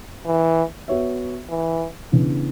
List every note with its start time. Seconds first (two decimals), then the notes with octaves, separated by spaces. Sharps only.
0.26 E3
0.88 B3 F#4 C#5 E5
1.49 E3
2.12 C#3 E3 B3 D4